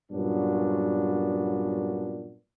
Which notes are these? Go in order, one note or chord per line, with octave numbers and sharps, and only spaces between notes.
G2 A#2 F#3 B3 C#4 D4